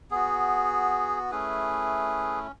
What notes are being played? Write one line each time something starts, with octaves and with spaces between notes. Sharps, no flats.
B3 F#4 G#4
A3 C#4 E4 G#4 B4